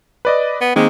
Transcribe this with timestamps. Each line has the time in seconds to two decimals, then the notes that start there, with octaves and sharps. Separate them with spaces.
0.25 B4 D5 D#5
0.61 B3
0.76 D#3 G#3 A#3 C4